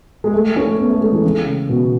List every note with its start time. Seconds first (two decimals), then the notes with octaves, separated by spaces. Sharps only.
0.24 G#3
0.34 A3
0.56 C#4
0.79 B3
0.90 A3
1.01 G#3
1.12 E3
1.24 C#3
1.69 B2